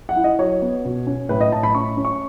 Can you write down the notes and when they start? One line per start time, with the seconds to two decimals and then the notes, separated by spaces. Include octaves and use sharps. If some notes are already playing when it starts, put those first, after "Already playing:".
0.09 F#5
0.16 E4
0.24 D#5
0.39 F#3 C#5
0.62 B3
0.85 B2
1.07 C#4
1.29 A2 B4
1.41 D#5
1.52 A2 A5
1.63 B5
1.75 C#4 C#6
1.97 C#4
2.05 C#6